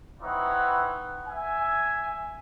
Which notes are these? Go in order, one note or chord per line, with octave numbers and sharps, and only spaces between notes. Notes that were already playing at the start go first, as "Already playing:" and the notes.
C4 D#4 E4 B4 C#5 F#5
E5 G#5